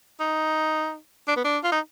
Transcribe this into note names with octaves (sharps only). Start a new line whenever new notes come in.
D#4
D4
B3
D4
F4
D#4